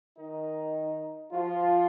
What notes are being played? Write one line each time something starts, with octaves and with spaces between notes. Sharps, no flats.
D#3 D#4
F3 F4